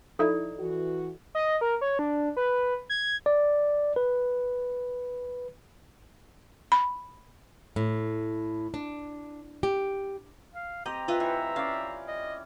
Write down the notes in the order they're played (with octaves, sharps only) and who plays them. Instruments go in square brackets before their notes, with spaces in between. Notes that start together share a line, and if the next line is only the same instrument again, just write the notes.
[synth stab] F3 D#4 E4 [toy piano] A4 D5
[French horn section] E3 F#4
[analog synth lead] D#5
A#4
C#5
D4
B4
G#6
[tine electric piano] D5
B4
[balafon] B5
[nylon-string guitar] A2
D4
G4
[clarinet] F5
[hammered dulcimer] C4 G4 [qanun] D#5 [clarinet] A#5
[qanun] F4 B4 D#5 [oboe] E5
[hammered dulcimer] E3 [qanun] C#5 [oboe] E5
[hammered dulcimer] C#4 D5 [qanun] F5
[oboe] D#5